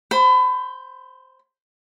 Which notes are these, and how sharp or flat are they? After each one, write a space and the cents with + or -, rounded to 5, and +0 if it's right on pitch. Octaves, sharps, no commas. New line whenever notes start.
C5 +0 B5 +30